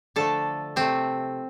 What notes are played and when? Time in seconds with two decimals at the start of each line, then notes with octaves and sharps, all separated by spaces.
0.16 D3 F3 A3 A4
0.76 C3 A3 C4